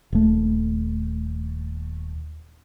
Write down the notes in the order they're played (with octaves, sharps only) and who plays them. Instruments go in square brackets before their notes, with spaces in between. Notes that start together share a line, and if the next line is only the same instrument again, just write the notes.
[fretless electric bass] D#1 A3